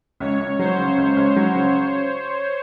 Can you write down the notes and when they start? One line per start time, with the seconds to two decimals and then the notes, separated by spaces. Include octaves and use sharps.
0.20 C#2 C#5
0.39 C#2
0.59 F#3 C5
0.78 C#3
0.98 C#2
1.17 C#2
1.36 F#3
1.55 C#3